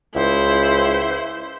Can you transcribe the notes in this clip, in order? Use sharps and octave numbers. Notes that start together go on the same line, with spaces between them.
C#2 E4 C5